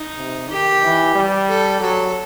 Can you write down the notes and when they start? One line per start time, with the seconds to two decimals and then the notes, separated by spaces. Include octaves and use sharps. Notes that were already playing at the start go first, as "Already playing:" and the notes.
Already playing: D#4
0.18 C3
0.50 D#3 G4
0.83 E3
1.15 G3
1.48 A4
1.81 F#3 A4